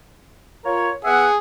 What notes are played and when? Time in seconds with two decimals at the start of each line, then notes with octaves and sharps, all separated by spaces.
0.64 F4 A#4 C#5
1.04 B3 G#4 E5 F#5